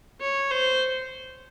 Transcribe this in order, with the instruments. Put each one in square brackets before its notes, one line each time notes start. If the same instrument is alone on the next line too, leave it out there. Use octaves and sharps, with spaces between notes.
[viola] C#5
C5